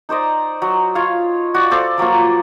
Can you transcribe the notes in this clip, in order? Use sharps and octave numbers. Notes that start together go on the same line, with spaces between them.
D#4 C5 D5 D#5
F#3
F4 C#5 F5
F#4 D5
A4 C5 D5 F5
F3 F#3 A#3 F4